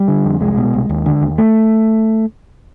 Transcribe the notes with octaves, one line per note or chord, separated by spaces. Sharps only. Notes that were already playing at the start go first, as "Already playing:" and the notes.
Already playing: G3
D3
F2
C2 G#3
B2
C2
D#2
D3
D#2
A3